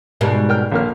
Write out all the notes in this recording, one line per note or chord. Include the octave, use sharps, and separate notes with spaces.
G#2 B2 G3 A#4
A#4 G5 F6
A#1 A#3 F6